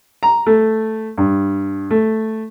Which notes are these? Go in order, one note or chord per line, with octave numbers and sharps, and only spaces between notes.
A#5
A3
G2
A3